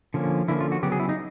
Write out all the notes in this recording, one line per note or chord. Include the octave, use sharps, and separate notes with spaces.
D3 F3 A#3 C#4
D3 F3 A#3 C#4 E4
F4
F#4
C#3 F#3 B3 G4
G#4
E4
D#4